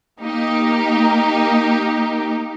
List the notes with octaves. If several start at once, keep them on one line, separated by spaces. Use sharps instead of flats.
A#3 D#4 G4